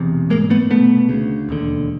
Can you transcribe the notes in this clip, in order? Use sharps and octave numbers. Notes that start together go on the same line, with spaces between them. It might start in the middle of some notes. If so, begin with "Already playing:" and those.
Already playing: E1 E2 C3
A1 G#2 G#3 A#3
A3 B3
C2 B2 A3 B3
D2 C#3
E1 D#2 D3